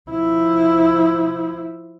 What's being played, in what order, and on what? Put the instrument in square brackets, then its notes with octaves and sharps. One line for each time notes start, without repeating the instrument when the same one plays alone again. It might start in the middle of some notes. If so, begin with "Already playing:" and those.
[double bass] F3 E4